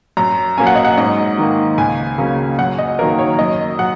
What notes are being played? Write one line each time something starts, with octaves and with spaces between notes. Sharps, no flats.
F#2 A#5
F#3 A#3 C#4 G#5
F#5
D#5
F#5
G#2 D#5
D#3 A#3
C#2 G#5
C#3 F#3 A#3 C#4
F#2 F#5
D#5
D#3 F#3 A#3 A#4
C#5
F#2 D#5
F#3 F#5